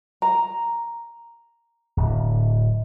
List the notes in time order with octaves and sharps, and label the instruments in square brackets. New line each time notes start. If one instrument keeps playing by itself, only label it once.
[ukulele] A#5
[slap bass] D1